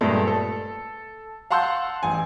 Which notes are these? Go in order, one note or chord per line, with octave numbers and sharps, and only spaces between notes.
G2 A#2 G#3 A3
A4
F5 F#5 A5 C6 E6 G6
A1 G#5